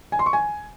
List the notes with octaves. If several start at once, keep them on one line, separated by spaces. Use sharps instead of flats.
G#5
C6
C#6
G#5